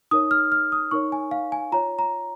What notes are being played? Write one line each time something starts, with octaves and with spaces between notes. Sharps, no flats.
D#4 A#4 C#5 D#6
F6
F6
D#6
D#4 A#4 C#5 C#6
G#5
F5
G#5
F4 C#5 A#5
A#5